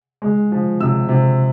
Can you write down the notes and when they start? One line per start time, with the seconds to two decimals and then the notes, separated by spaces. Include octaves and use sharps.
0.22 G#3
0.52 F3
0.80 C3 E6
1.09 C3